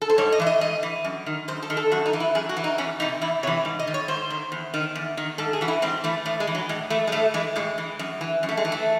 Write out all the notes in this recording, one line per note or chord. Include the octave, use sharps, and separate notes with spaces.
A4
C5
G#2 C#5
D#5
E3 E5
D#5
G#2 D#5
E3
F#2
D#3
F#2 C5
A4
D#3
A4
F#2 F#4
D#4
E3
E4
F#2 G#4
F#4
E3
D#4
E2 C#4
C3 E3 D#4
E2 E4
C3 E3 C#5
G#2
D#5
D#3
C#5
G#2 C5
D#3
E2
D#3
E2
D#3
G#2 A4
G#4
E3 F#4
E4
G#2 C4
E3 A3
A2 A3
G#3
E3
F#3
A2 G#3
E3 A3
G#3
A2 A3
E3 G#3
A2 G#3
E3
F#2
E3
F#2
A3
G#3
E3
A3